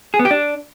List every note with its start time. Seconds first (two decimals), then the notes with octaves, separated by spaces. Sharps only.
0.14 G#4
0.19 B3
0.25 G4
0.31 D4